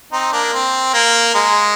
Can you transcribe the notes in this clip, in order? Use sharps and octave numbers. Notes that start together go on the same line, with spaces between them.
C4 D#4
A#3 D4
C4
A#3
G#3